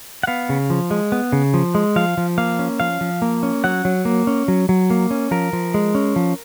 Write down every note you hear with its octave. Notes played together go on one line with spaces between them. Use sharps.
F#5
B3 F5
C#3
F3
G#3
B3
C#3
F3
G#3
F3 F5
F3
A#3 F5
C#4
F3 F5
F3
A#3
C#4
F#3 F#5
F#3
A#3
C#4
F#3
F#3
A#3
C#4
F3 A#4
F3
G#3
C#4
F3